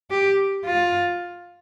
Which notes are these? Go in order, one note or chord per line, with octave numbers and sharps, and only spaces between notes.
G4
F4